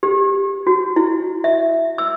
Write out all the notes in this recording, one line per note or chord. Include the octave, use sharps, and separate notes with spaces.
G4
F#4
E4
E5
E6